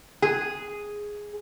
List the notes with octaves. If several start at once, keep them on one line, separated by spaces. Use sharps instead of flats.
G#4